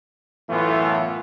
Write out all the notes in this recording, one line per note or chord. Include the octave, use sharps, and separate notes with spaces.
F#2 A2 E3 A3 B3 F4